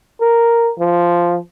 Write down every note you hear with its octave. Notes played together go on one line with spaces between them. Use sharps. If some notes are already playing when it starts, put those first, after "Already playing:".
A#4
F3